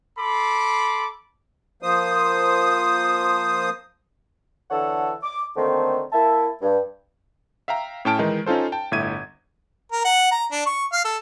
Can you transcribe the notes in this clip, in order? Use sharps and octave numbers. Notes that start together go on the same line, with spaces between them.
A4 B5 C6 D6
F3 A#3 C5 D#6
D3 E3 A4 C#5 F#5 E6
D6
D3 D#3 A3 A#3 C4
A#3 E4 E5 A5
G2
E5 F5 G5 A#5
A2 C#4 G5 A5 F6 D7
D#3 E3 G#3 D#4
C#4 D#4 F4 A4 C5
G5 A5
G1 A2 E5 G#6 D#7
A#4
F#5
A#5
D4
C#6
F5
A4